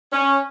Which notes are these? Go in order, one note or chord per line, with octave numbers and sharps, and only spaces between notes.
C#4